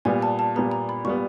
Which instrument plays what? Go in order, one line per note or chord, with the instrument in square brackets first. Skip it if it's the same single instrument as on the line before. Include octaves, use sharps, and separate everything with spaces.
[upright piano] A#2 G3 B3 [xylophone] G#5
[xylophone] A5
A5
[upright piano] A#2 G3 B3 [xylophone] A#5
[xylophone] A#5
B5
[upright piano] A#2 G3 B3 [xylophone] C#6